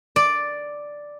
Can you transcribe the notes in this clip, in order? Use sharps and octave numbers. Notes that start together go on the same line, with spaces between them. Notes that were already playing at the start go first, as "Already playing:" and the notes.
D5